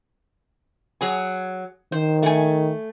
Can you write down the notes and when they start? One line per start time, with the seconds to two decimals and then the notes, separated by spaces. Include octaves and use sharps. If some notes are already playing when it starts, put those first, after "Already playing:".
1.01 F#3 G#4 G#5
1.92 D#3 C5
2.23 A3 G#5